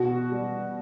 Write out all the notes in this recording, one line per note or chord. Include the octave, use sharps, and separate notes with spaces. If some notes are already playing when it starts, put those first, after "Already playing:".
Already playing: B2 F#4
G3